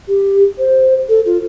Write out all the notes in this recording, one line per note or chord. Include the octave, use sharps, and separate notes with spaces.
G4
C5
A4
F4